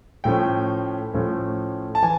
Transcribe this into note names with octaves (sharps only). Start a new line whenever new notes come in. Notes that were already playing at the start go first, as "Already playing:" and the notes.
A2 F3 A3 C#4 G5
A2 F3 A3 C#4
A5
E3 G#5